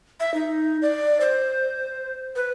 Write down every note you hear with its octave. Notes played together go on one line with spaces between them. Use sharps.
E5
D#4
D5
C5
B4